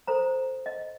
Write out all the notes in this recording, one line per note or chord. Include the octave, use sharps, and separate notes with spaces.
A4 C5 A#5
D#5